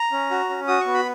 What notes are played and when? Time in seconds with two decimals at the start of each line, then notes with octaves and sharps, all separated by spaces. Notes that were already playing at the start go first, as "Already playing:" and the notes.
Already playing: A#5
0.12 C#4
0.31 F#4
0.49 C#4
0.68 F#4 D#6
0.81 C#6
0.86 B3
0.94 B5